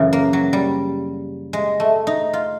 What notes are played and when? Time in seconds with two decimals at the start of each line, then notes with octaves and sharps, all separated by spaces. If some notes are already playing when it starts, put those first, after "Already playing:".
Already playing: F#2 C#3 E3
0.13 A#3
0.33 F#3
0.53 G3
1.53 G#3
1.80 A3
2.07 D#4
2.33 F4